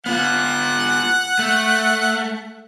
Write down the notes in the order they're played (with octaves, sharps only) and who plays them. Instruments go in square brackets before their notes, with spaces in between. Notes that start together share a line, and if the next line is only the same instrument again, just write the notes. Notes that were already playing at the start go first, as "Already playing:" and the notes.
[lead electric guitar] B3 F4 [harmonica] F#5
[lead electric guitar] A3